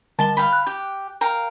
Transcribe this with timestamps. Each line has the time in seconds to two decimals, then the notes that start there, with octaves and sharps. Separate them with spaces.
0.19 D3 G3 A5 G7
0.37 F5 G5 B5
0.53 F#6
0.66 G4 G5
1.21 A#4 F5 G5